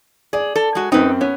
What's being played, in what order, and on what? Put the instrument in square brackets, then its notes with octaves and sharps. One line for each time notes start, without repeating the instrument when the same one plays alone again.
[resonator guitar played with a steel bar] G#4 [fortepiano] D5
[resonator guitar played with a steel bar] A4
G#3 F#4
[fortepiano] F#2 C4 [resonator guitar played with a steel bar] D#4 B4
[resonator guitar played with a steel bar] B3 [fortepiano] C#4